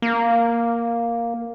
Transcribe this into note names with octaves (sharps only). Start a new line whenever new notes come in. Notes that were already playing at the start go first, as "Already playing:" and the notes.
A#3